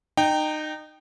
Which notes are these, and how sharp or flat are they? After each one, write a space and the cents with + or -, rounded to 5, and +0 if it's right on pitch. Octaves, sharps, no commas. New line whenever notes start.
D#4 -25 G5 +0